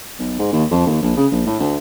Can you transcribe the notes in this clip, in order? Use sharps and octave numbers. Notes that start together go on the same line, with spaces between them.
B1
G#2
D#2
F2
D#2
A#1
C#3
A#1
A2
D2